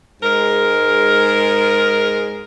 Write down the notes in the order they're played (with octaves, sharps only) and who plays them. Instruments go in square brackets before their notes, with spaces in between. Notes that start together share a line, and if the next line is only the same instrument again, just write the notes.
[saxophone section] G#2 G#3 A#4